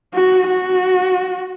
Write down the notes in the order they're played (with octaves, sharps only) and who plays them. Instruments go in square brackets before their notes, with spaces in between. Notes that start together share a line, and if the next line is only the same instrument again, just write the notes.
[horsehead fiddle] F#4
F#4